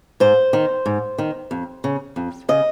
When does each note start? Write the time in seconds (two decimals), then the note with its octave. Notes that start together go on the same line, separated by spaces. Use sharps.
0.20 G#2 C5
0.53 D#3
0.86 G#2
1.18 D#3
1.51 F2
1.84 C#3
2.16 F2
2.49 C#3 D#5